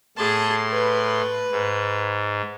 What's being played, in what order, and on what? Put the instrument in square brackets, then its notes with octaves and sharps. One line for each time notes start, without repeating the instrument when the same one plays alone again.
[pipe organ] A2 C6 [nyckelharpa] G#4 A5
[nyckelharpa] B4
[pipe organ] G#2